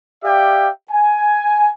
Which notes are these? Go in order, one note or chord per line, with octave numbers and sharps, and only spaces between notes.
G4 D5 E5 F5 G5
G#5